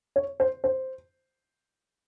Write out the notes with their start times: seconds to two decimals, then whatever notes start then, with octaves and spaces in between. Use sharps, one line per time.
0.16 C#5
0.40 C5
0.64 C5